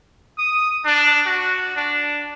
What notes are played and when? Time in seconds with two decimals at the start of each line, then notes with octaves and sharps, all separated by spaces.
0.39 D#6
0.85 D4
1.26 F#4
1.77 D4